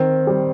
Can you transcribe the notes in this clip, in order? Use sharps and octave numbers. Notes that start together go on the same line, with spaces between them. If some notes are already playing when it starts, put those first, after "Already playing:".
Already playing: D#3 C4
G3